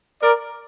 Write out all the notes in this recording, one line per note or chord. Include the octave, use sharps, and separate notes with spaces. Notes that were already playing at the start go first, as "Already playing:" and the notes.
A#4 D5